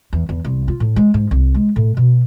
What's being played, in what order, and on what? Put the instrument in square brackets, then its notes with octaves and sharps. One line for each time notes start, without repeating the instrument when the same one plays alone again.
[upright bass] E2
E2
C2
F4
A2
G#3
G#2
C2
G#3
A2
B2